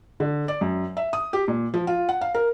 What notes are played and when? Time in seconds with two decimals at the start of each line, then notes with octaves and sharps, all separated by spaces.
0.20 D3
0.48 D5
0.61 F#2
0.97 E5
1.13 D#6
1.33 G4
1.48 A#2
1.74 F3
1.87 F4
2.09 F#5
2.21 F5
2.35 A#4